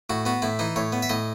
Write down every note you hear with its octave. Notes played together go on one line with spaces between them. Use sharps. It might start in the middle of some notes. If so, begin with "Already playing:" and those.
A2 F#4
B3 F#4
A2 E4
E3 D#4
A2 C#5
B3
E5
A2 D#5